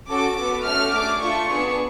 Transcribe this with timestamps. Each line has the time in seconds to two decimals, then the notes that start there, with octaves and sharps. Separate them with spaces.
0.09 C#4 F#4 A4 D6
0.38 B3 F#4 A4
0.65 A3 C#4 F#4 A4 F6
0.93 A3 D4 G#4 D6
1.21 A3 D4 F4 A4 C#6
1.50 B3 D4 G#4